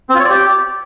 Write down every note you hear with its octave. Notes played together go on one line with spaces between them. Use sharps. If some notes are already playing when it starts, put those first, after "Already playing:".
C4
F4
C#5
D5
G4